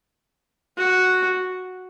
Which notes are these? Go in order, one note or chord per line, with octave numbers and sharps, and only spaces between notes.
F#4